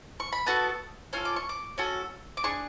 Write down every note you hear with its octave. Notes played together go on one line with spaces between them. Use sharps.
C#6
B5
B3 F#4 A4 A5
C#4 F4 A4 F6
D6
C#6
D6
C#4 F#4 A4
D6
D4 G#4 C#6